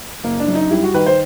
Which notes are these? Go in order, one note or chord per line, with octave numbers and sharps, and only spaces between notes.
F#1 A#3
D4
F#2
D#4
G3 E4
F#4
D#3 B4
C5